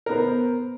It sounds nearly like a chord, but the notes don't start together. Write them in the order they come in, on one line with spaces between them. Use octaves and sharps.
A#4 B3 C5